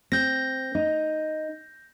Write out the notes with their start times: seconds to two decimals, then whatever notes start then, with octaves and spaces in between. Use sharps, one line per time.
0.12 C4 G6 A#6
0.75 D#4